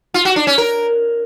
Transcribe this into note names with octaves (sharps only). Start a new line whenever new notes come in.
F4
F#4
D4
C#4
A#4